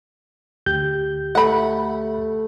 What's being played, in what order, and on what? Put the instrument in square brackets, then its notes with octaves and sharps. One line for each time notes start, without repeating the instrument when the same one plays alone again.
[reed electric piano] D2 G4 G6
[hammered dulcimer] A3 [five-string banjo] F#5 B5